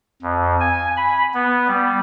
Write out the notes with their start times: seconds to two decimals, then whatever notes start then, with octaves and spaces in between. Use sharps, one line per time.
0.22 F2
0.60 G#5
0.97 B5
1.34 B3
1.68 G3